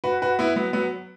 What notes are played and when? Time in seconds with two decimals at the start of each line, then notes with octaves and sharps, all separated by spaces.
0.04 F#4 B4
0.22 F#4 B4
0.39 B3 E4
0.56 F#3 B3
0.73 F#3 B3